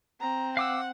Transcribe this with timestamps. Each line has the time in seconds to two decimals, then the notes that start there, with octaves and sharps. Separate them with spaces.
0.20 C4 A#5
0.57 F5 F#5 D6 E6